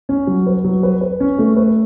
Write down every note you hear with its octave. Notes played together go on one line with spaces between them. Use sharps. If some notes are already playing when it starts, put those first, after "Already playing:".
C#4
F#3
B4
F#3
B4
B4
C#4
A3
B4